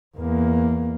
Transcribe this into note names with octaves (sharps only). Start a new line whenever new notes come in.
E2 A#3